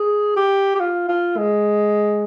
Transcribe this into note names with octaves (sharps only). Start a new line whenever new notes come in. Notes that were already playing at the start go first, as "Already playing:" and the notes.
Already playing: G#4
G4
G4
F4
F4
G#3